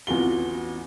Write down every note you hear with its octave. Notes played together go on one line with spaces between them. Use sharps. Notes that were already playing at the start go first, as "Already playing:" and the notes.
A1 E2 F4 F#4 G7